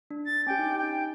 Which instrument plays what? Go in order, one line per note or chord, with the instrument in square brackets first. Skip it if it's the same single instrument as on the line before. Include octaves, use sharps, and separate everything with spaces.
[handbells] D4
[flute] A6
[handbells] C#4 G4 [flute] G5
[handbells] D#4
[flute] G5